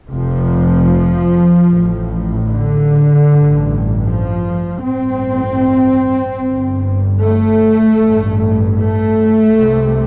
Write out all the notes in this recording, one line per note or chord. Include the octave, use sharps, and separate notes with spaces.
F1 F2 C3 F3
A1 A2
D3
A1 G2
F3
A1 G2 C4
G1 G2
A3
A1 G2
A3
C2 C3